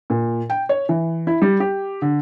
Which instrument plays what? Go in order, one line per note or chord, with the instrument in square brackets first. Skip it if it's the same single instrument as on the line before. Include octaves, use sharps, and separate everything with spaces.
[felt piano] A#2
G5
C#5
E3
E4
G3
G4
D3